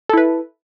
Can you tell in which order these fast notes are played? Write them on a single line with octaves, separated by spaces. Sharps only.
A4 E4 B4